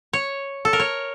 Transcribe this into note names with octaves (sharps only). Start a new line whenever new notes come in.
C#5
A4
A#4
C#5